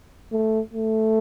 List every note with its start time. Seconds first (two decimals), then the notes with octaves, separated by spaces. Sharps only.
0.32 A3
0.74 A3